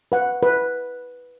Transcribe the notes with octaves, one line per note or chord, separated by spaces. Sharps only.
B4 F#5
B4